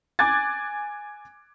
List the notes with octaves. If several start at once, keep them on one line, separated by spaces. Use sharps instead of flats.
G#5 D6 F#6 G#6 A6